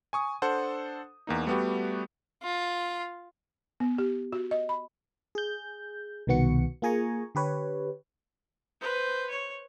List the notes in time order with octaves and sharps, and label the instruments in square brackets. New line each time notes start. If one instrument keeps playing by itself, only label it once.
[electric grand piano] G#5 C#6 D#6
D4 A4 C5 F#5
E2 A#3 D#4
G3 A3 B3 F#4 G4
[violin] F4
[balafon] B3
G4
F#4
D#5
B5
[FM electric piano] G#4 G6
C2 B2 D#3 B3 F#4 C#7
A#3 F4 G#4 G#5 A#5 C#6
D3 G4 B4 C#5
[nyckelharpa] B4 C5
C#5